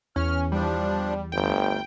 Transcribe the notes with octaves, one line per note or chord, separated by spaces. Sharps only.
E2 C#4 F6
F3 G3 D4
G1 D2 G5